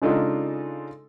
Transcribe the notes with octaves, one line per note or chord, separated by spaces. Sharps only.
C#3 G#3 D4 D#4 F4 A4